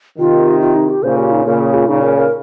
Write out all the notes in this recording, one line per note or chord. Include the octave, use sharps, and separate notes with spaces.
C3 D#3 F4
F4
D#4
G4
A#2 C#3 C5
G4
D#4
A#2 C#3 A#4
G#4
F4
A#2 C#3 D#4
A#4
A#4